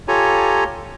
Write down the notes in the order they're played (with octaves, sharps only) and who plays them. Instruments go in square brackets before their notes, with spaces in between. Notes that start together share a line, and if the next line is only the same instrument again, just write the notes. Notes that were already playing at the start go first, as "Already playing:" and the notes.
[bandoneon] F4 G4 A4 C#5 G#5 A#5